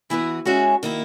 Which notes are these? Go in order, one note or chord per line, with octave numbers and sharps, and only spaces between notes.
E3 B3 E4 F#4 B4
G#3 C#4 F#4 G#4 C#5 E5
D#3 A#3 E4